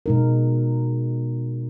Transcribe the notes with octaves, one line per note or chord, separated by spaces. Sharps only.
B2 G#3 D#4 A#4